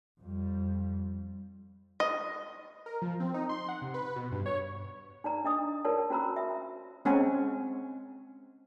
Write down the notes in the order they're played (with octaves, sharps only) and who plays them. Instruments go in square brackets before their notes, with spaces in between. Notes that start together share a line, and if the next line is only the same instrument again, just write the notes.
[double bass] F2 G3
[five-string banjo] D#5
[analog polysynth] A#4
F3
C4
D#4
C6
F#5
C3
B4
B2
G2
C#5
[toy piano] D#4 D5 A#5
D4 D#5 D#6
F4 A#4 C#5 D5 A5
C#4 F#4 C5 A#5 B5 E6
E5
[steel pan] G#3 C4 C#4 F#5 G#5